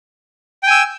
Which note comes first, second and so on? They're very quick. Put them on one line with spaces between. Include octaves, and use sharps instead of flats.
G5 G#5 E6